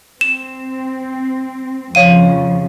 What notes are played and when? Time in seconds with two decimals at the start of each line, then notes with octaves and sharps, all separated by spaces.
0.21 C4 E7
1.95 F2 C#3 F3 C#5 F5 D#7